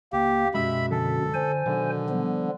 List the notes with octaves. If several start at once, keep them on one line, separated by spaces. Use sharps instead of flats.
C#2 A#3 G4
F#2 B2 G#3 E5 B5
D3 F3 G#3 A4
D3 C5 G#5
B2 D3 D#3 F#3
F3 G3 B3